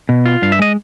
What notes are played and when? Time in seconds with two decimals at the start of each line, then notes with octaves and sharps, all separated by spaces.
0.09 B2
0.26 F4
0.42 G2 F5
0.52 E5
0.59 G#3 D#5